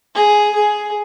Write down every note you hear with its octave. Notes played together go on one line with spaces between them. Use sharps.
G#4
G#4